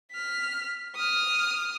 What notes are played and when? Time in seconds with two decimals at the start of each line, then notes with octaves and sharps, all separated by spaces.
0.12 F6 B6
0.96 D#6 F6